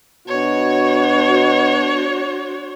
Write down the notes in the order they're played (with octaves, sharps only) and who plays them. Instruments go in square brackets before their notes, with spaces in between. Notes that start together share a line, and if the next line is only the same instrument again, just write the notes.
[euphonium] B2 [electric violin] D4 F#4 [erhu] C#5